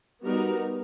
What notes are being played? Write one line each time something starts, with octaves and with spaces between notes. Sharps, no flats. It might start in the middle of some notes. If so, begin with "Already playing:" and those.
G3 B3 D#4 F#4 A#4